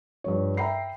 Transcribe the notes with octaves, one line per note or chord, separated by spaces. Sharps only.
G2 F3 C#5
E5 G5 A#5 B5 C7